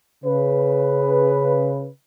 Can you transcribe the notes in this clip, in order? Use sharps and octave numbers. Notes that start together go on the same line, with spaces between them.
C#3 B4